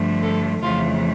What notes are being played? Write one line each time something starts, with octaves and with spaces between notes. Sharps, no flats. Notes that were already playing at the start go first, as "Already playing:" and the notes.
Already playing: G2 D3 F3 A3
A4
F2 C#3 E3 A3 F4